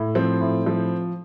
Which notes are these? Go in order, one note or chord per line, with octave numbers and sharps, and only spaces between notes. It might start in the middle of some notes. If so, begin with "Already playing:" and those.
Already playing: A2
F3 C4
A2
F3